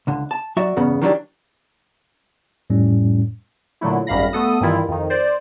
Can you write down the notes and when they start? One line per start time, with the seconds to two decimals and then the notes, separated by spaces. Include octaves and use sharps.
0.07 C#2 D3
0.31 A5
0.57 F#3 F#4 D5 E5
0.76 E2 G2 C#3 B3
1.02 D#3 E3 F#3 G3 B3 D4
2.70 F2 A2 G3 C#4
3.81 A#2 D3 F#3 A3 E4
4.07 G#1 F#2 G3 F5 B5 A#6
4.33 A3 B3 A4 D#6
4.61 G2 D#3 E3 E4 F4
4.89 F2 D#3
5.10 C5 D5